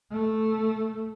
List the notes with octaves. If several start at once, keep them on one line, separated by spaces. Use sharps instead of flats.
A3